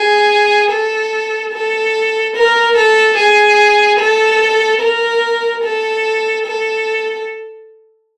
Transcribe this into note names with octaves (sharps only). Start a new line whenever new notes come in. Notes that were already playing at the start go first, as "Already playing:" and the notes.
Already playing: G#4
A4
A4
A#4
A4
G#4
A4
A#4
A4
A4